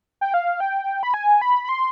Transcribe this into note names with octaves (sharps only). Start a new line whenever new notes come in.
G5
F5
G5
B5
G#5
B5
B5
C6